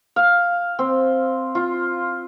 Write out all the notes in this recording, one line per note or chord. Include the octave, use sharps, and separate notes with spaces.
F5
C4
F4